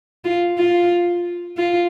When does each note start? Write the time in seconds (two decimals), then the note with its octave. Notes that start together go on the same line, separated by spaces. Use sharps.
0.24 F4
0.58 F4
1.57 F4